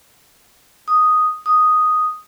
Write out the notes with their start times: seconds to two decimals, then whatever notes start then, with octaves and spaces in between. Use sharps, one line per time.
0.88 D#6
1.46 D#6